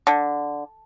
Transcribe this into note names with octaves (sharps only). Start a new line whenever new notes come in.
D3